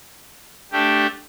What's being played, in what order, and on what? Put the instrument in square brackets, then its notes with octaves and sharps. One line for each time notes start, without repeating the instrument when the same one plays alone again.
[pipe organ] A3 D4 G4